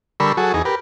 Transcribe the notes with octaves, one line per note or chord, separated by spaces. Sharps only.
D3 G3 A#4 B5 C#6 E6
F#3 F#4 G#4 A4
E2 D#4 G#4
G4 A#4 B4